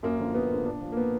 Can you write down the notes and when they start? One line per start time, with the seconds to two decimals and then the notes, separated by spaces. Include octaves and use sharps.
0.03 F#2 A#3
0.19 D3 F3
0.34 F#2 B3
0.51 D3 F3
0.65 A#2 D4
0.81 F3
0.92 A#3
0.97 A#2 B3